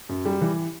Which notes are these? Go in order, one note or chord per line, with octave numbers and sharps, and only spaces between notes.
F#2
G3
E3